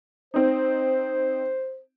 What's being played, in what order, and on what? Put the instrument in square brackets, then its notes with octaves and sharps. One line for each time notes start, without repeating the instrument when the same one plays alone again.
[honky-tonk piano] C4 D#4 [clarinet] C5